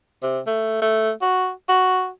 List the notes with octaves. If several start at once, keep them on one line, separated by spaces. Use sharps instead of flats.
C3
A3
A3
F#4
F#4